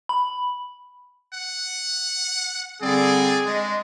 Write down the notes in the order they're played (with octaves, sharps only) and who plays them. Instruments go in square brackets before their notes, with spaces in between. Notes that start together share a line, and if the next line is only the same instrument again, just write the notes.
[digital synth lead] B5
[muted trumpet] F#5
[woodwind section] D3 G3 C4 [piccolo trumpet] G#4 [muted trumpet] D5
[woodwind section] G#3 [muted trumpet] D4